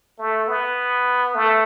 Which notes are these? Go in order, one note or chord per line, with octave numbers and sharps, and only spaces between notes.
A3
B3
A3